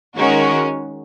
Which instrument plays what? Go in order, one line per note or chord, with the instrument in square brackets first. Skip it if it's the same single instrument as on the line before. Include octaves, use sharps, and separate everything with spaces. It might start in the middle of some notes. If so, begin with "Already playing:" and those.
[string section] D#3 G#3 F#4 A#4 [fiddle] C#4